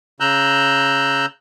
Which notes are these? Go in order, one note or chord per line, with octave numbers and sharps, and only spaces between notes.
C#3 A#5 E6 F#6 G6